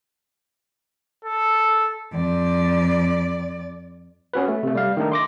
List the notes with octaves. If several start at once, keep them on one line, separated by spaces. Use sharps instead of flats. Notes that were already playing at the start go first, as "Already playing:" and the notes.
A4
F2 D5
B3 C#4 F#4 B4
A3
C3 A3
G3 F5
D#3 A3 D4 D#4
C6 D6 A#6